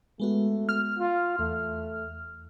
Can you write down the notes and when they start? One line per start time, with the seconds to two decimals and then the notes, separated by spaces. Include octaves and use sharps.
0.20 G#3 A3 B3 F#4
0.69 F6
0.98 F4
1.39 E2 A3